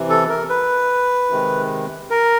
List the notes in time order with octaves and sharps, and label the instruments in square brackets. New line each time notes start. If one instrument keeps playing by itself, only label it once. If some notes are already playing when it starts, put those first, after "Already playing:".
Already playing: [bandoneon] C3 E3
A4
A#4
B4
C3 D#3 G#3
A#4